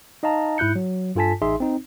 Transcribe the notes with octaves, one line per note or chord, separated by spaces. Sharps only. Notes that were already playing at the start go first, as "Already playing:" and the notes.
D#4 D#5 F5 A5 A#5
G#2 E4 F#6 G6 C#7
F#3
G2 F4 A4 G#5 A5 B6
A1 D#4 G#4 E5 C6
C4 D#4